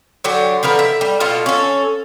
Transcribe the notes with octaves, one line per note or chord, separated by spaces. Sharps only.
D3 F#3 D4 G4
D3 F3 A#4 B4
E5
G3
B2 F4 A4 F5
C#4 A4